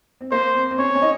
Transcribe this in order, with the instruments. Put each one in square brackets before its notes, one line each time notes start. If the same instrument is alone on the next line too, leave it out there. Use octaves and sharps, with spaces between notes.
[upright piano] C4
[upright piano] A#3 [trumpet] C5
[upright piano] C4
C4
[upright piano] C#4 [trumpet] C#5
[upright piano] C#4
D#4